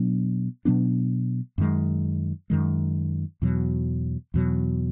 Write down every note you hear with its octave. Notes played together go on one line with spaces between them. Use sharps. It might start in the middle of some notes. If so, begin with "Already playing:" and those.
Already playing: B2 F#3 B3 D4
B2 F#3 B3 D4
F#2 D#3 G#3
F#2 D#3 G#3
E2 B2 F#3
E2 B2 F#3